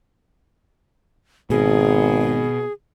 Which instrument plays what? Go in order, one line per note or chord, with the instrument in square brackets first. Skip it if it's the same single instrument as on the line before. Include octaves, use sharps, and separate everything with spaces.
[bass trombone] G#1 [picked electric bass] B2 [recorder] G#4